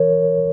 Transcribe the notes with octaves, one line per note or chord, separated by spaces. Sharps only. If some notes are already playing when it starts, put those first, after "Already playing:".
Already playing: E3 A#4 C#5